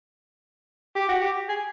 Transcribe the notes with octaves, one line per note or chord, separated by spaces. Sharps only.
G4
F#4
G4
G#4